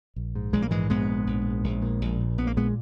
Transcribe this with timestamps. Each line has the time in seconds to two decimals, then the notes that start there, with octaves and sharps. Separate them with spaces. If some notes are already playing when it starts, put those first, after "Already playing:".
0.16 A#1
0.35 G#2
0.53 A#1 G#3
0.62 A#3
0.71 G#2 E3 G#3
0.90 A#1 G#3 B3
1.08 G#2
1.27 A#1
1.46 G#2
1.64 A#1
1.82 A#2
2.01 A#1
2.20 A#2
2.38 A#1 B3
2.47 A#3
2.57 A#2 G#3 B3